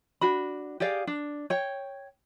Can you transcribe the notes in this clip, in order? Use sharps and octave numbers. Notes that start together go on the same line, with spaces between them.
D4 F#4 B5
G4 G#4 D5 F5
D4
C#5 G5